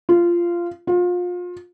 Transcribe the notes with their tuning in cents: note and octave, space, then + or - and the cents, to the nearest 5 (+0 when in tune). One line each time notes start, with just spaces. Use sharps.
F4 -15
F4 +30